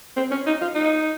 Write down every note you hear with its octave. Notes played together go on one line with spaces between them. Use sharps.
C4
C#4
D#4
F4
D#4